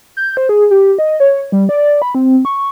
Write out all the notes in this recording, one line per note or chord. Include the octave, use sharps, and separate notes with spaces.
G6
C5
G#4
G4
D#5
C#5
G3
D5
B5
C4
C#6